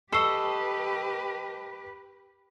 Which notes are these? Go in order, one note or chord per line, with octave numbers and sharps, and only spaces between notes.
G4 A4 B4 D#5 C#6 E6 C7